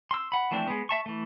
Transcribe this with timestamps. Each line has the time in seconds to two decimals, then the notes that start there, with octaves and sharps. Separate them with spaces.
0.11 C6 E6
0.32 F#5 B5
0.51 E3 F3 A3 C4 D4
0.68 G#3 B3
0.89 E5 A5 C#6
1.06 E3 A3